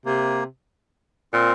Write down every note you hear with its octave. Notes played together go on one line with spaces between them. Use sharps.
C3 A#3
A#2 C4